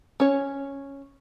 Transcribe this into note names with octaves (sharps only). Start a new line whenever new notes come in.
C#4 C#5